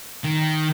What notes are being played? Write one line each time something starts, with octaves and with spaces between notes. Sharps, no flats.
D#3